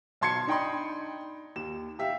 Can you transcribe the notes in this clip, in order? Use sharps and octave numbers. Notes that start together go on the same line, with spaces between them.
B1 A5 C6 G#6 C7 C#7
D4 D#4 G5 B5 C6
D#2 E7
G4 E5 F5